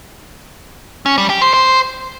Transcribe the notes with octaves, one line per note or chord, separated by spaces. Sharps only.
C#4
G3
G4
C5
C5